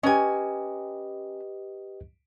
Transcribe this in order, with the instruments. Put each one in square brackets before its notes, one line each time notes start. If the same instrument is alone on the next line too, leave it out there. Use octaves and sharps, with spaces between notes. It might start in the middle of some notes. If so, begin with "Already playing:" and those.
[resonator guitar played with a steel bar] C#4 G#5 [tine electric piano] G4 B4 D#5